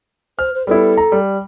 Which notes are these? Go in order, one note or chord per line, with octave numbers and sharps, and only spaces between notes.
C5 F6
C5
G3 B3 E4 A4
A#5
G3